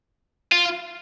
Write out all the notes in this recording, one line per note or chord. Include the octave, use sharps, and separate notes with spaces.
F4